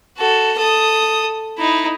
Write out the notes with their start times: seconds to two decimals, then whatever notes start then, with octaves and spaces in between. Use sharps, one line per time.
0.17 F#4 A4
0.58 A4 D#6
1.58 D#4 E4